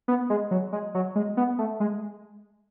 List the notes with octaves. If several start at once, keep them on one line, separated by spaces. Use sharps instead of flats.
B3
G#3
F#3
G#3
F#3
G#3
B3
A3
G#3